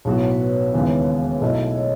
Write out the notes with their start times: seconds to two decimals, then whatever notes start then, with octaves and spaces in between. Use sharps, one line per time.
0.05 B1 A2 F#3 B3 F#4 C#5
0.31 B4
0.40 C#5
0.73 E1 D#2 C#3 E3 B3
1.41 B1 B2 A3 E4 D#5
1.76 C#5